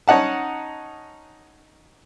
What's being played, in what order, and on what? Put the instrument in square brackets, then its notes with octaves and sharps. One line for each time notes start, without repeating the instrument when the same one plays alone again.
[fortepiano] C#4 D#4 F#5 A5